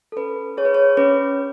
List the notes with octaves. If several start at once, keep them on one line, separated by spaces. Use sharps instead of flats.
A4
C#4 B4
G#4 C#5
B4
C#5
C#4 B4